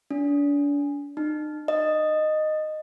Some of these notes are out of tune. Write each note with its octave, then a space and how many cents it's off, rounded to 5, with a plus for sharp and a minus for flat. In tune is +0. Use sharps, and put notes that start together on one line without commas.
D4 -35
D#4 -40
D#5 -10